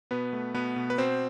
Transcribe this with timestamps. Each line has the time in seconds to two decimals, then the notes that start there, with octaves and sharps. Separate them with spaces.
0.11 B2 B3 B4
0.33 A3
0.54 B2 B3 B4
0.76 B2
0.90 B4
0.98 B2 C4 C5